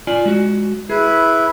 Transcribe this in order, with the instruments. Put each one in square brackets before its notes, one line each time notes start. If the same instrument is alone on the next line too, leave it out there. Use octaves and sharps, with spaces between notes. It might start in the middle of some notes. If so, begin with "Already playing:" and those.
[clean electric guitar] F4 D5 G#5
G#3 F#4
[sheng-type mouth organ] E4 B4 [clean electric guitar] G#4